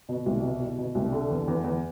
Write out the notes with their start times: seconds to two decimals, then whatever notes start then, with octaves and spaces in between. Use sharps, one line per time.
0.09 B2
0.26 C2
0.42 B2
0.60 B2
0.78 B2
0.95 C2
1.12 D3
1.30 E2
1.48 E2
1.64 E2